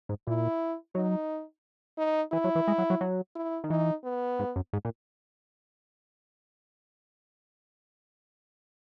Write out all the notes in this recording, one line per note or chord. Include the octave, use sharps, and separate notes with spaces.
G#2
A#2 E4
F#3 D#4
D#4
E3 E4
F#3
E3
G#3
F#3
F#3
F#3
E4
D#3
E3 D#4
B3
G#2
F#2
G#2
A#2